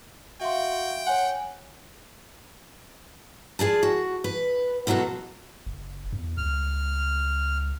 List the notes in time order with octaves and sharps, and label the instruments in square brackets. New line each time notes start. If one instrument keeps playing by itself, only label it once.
[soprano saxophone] F#4 [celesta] E5 F5 C6 [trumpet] G5
[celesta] C#5 G#5 [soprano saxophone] F#5
[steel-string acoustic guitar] F4 G#4 D5 A5
F#4
B4
B2 F#3 F4 F#4 A4
[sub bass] F#1
E2
[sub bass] C#2 [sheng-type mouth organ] F6